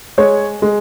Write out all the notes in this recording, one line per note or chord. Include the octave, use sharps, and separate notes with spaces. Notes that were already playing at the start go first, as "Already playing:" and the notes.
G#3 C#5
G#3